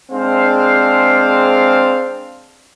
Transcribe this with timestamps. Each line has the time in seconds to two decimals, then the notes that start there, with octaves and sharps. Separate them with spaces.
0.11 G#3 C4 D4 G#4 C5 F5